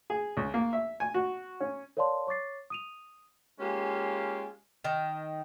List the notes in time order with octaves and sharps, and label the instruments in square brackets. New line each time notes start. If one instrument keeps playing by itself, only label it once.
[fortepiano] G#4
C#2
A#3
E5
G#5
F#4
C#4
[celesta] A#4 C#5 D5 F5 A5 C6
C#5 C#6 D6 A6 C7
D#6 D#7 F7
[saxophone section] G#3 A#3 C#4 F4 G4
[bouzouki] D#3